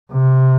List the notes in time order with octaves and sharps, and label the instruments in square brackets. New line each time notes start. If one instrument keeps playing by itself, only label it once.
[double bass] C3